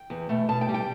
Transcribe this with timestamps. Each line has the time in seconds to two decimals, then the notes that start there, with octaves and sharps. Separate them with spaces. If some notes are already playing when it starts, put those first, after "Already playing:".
Already playing: G5
0.10 E2
0.29 B2 A3
0.49 B2 A5
0.61 G5
0.69 G3
0.74 G5